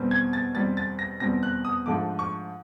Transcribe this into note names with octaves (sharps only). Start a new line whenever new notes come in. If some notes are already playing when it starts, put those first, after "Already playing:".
Already playing: E2 B2 G3 C4
G#6
A6
E2 B2 G3 C4 A6
A6
A#6
E2 B2 G3 C4 A#6
F#6
D#6
G#2 F3 A3 D4 D6
C#6